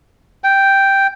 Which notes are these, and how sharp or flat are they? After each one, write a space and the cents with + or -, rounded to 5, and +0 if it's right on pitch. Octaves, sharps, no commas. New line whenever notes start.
G5 +0